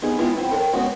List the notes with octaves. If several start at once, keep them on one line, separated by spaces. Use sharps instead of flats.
B3 D#4 G#4
G#3 B3 E4 F4
B3 C4 E4
A4 A#4 D5 G5
G#3 B3 C#4 F#4